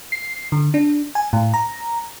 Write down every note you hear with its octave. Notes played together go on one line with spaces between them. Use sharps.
C7
D3
D4
G#5
A2
A#5